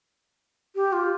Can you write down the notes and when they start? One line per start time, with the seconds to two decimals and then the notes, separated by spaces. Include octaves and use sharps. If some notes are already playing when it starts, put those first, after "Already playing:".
0.75 G4
0.93 F4